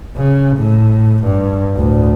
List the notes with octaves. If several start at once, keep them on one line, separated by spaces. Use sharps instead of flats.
C#3
A2
G2
D2 A2